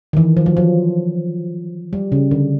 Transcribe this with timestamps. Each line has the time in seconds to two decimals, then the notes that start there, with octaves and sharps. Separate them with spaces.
0.13 D#3
0.17 E3
0.37 F3
0.46 F#3
0.57 F3
1.93 G3
2.12 C#3
2.31 D3